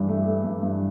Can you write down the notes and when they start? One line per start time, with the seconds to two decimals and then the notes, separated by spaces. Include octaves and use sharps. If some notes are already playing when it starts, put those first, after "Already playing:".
Already playing: G2 E3 D4
0.08 A3
0.27 A3
0.44 G2
0.63 G2